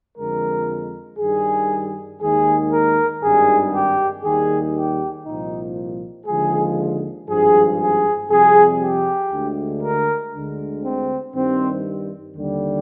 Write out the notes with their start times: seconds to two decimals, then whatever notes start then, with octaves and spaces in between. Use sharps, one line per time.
0.18 F2 D3 F3 G#3 A#4
1.19 G2 D#3 G3 G#4
2.20 D#2 D#3 G#3 G#4
2.71 A#4
3.23 G#1 G2 D#3 G3 G#4
3.73 G4
4.23 D#2 D#3 G3 G#4
4.75 G4
5.26 C2 A#2 F3 D#4
6.26 D#2 D3 F3 G#3 G#4
7.28 G#1 G2 F3 G#4
7.79 G#4
8.30 F2 C3 G3 G#4
8.80 G4
9.31 D2 D3 G#3
9.83 A#4
10.33 D2 D3 G#3
10.84 C4
11.34 G2 D#3 G3 C4
12.36 D#2 D3 G3